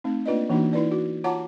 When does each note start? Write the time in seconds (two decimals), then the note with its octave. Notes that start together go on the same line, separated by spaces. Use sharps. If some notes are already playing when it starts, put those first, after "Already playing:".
0.04 A3 C4 D#4
0.26 A#3 D4 F4 B4 D5 D#5
0.49 E3 A#3 D4 D#4 F#4
0.73 D#4 E4 B4 D5
0.92 F#4
1.24 F4 C#5 F#5 A5 A#5 D6